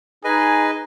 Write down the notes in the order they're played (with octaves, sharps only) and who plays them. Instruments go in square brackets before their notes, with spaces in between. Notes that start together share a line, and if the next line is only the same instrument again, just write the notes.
[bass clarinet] D#4 [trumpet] G#4 [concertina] B4 D#5 G#5